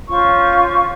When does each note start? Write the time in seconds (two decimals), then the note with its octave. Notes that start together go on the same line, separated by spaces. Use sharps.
0.08 C#4 F4 C5 C#6